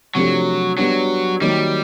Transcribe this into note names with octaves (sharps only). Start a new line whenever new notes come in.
C3 F3 F#3 A3 D4 G4
F#3 G3 B3 D4
D#3 F#3 G3 A#3